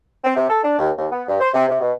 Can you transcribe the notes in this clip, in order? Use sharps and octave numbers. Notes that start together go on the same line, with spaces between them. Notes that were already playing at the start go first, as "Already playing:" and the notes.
C4
C3
A4
D4
D#2
D#2
B3
G2
C5
C3
C3
B2